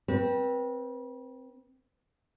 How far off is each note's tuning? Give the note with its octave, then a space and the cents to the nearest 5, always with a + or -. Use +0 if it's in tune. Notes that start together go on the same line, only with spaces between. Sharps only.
C4 +0 B4 -35